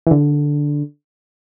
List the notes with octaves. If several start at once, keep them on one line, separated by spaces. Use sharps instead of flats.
E3
D3